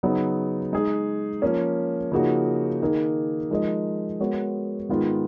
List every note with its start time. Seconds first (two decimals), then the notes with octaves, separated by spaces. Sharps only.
0.03 C#3 F#3 B3 D#4
0.72 G#3 D#4 G#4
1.42 F3 A#3 C#4
2.12 C#3 F3 A#3 D#4 F#4
2.81 D#3 A#3 D#4 G#4
3.50 F3 G#3 D#4 A#4 D#5
4.20 G#3 B3 F#4 A#4 C#5
4.89 G#2 D#3 G#3 B3 F4